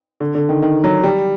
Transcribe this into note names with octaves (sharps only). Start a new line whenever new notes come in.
D3
D3
D#3
D#3
F#3
G3